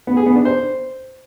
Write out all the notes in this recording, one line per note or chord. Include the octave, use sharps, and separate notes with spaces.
B3
G#4
B3
D4
C5